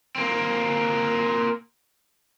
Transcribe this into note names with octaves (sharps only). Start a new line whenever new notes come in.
A#3 C4